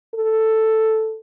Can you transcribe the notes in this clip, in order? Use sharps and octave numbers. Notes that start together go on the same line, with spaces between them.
A4